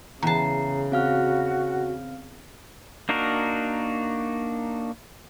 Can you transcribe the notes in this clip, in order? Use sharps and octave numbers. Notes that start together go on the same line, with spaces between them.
E2 C#3 A5 A#5 C7
C4 F#4 F5 F6
A#3 D4 D#4 F#4 A#4